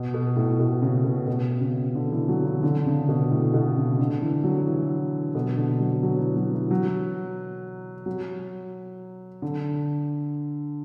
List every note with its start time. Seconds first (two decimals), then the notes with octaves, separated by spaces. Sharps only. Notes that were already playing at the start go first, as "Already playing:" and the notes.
Already playing: B2
0.14 B2
0.36 A2
0.59 B2
0.82 C#3
1.04 B2
1.27 B2
1.61 C#3
1.95 D3
2.12 E3
2.29 F#3
2.46 D3
2.63 D3
2.86 C#3
3.08 B2
3.31 A2
3.54 B2
3.76 C#3
3.99 D3
4.22 E3
4.44 F#3
4.67 E3
5.35 B2
5.57 D3
5.80 F#3
6.03 F#3
6.20 E3
6.37 F#3
6.54 E3
6.71 F#3
8.06 F#3
9.42 D3